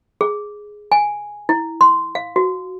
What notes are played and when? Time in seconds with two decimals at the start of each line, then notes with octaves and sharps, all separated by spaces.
0.21 G#4
0.92 G#5
1.49 E4
1.81 C6
2.15 F5
2.36 F#4